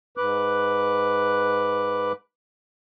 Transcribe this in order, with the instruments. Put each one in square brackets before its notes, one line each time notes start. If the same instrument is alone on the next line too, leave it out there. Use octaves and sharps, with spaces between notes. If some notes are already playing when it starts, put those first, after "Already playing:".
[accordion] G#2 B4 D6 F#6